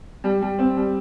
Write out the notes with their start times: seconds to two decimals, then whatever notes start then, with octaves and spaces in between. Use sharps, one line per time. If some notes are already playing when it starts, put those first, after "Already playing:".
0.24 G3
0.42 G3
0.59 C4
0.77 G3